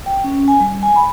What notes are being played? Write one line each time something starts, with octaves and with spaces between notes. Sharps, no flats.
G5
C#4
G#5
G3
G#5
B5